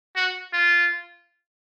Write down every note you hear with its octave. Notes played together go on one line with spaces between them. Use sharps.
F#4
F4